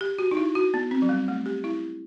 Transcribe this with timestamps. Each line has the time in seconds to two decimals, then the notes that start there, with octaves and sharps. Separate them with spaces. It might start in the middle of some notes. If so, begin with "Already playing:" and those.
0.01 G4
0.19 F#4
0.31 D#4
0.37 E4
0.55 F#4
0.74 B3
0.91 C4
1.02 F#3
1.09 G3
1.28 A3
1.46 G4
1.64 E4